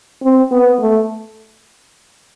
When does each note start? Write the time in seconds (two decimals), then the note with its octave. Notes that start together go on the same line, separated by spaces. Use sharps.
0.22 C4
0.51 B3
0.80 A3